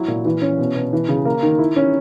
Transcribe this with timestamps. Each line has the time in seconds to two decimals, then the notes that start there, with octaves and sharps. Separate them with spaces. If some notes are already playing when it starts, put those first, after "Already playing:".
Already playing: F#3 E4
0.08 A#2
0.25 E3
0.42 C#4
0.59 B2
0.75 B2
0.93 E3
1.09 C#3
1.25 A#3
1.43 D#3
1.59 E4
1.76 C#4